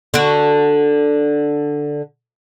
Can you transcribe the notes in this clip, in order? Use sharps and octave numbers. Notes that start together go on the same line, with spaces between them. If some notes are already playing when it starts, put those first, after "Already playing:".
D3 F#4